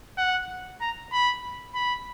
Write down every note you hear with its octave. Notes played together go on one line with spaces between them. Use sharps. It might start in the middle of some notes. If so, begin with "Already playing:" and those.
F#5
A#5
B5
B5